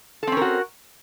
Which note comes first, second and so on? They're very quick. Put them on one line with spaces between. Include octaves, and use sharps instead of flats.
A4 C4 C#4 A#4 F#4